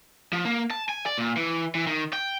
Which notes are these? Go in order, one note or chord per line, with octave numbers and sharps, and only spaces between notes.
F3
A#3
A5
G#5
D5
A#2
E3
E3
D#3
G5